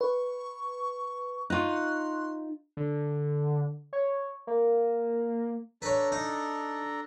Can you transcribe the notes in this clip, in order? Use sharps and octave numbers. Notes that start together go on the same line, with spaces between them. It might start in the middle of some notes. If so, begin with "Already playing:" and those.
B4 C#6
D#4 F4 C#6 F#6
C6
D3
C#5
A#3
D4 A4 B4 C#5 A#5
D#4